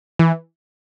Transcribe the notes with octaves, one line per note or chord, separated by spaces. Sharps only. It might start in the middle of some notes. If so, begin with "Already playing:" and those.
E3